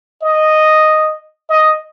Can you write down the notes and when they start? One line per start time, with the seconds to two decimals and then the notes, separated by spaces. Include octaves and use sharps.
0.22 D#5
1.49 D#5